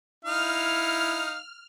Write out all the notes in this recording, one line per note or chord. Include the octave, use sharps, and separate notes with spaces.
D#4 E4 F5 F6